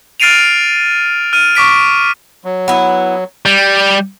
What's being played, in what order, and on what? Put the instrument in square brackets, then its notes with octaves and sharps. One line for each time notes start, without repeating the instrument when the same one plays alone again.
[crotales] F6 A6 C7 D7 D#7 F7
F6 D#7
C#6 D6 B6 D7
[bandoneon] F#3
[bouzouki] B3 E4
[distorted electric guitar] G3